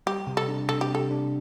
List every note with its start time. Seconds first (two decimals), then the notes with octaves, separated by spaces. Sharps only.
0.06 G3 G4
0.27 C3
0.37 A4
0.48 D4
0.69 C3 A4
0.81 G4
0.90 C3 A4
1.11 D4